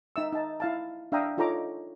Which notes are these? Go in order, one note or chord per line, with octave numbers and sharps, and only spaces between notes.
D#4 E5 E6
D#4 A5
E4 F5 A5
D4 E5 F5 G5 A#5 D#6
D#4 F4 A4 C#5 A#5 D6